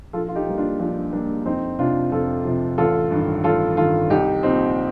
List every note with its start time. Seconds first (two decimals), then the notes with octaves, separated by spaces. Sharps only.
0.13 A#1 F4 A4
0.28 F4
0.36 D#4 G4
0.47 A#2 G3 A#3
0.58 D4 F4
0.79 A#1 D4 F4
1.13 A#2 G3 A#3 D4
1.45 F2 C4 D#4
1.79 C3 F3 D4 F4
2.12 F2 F4 A4
2.45 C3 F3
2.78 A1 F4 A4
3.11 G2 D#3
3.44 A1 F4 A4
3.77 G2 D#3 F4 A4
4.10 C2 D#4 G4
4.43 A#2 F3 C4 D#4